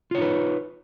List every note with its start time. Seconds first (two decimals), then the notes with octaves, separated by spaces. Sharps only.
0.11 F4
0.15 C#5
0.18 D#4
0.22 B4